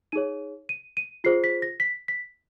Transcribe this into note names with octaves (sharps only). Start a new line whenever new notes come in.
D#4 G#4 C#5 D#7
D#7
D#7
F4 G#4 C5 C7
B6
A#6
B6
B6